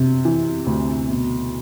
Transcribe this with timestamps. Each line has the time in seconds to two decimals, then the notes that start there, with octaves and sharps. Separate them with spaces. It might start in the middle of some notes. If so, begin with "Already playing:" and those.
Already playing: C3
0.25 E3
0.66 D2
1.09 B2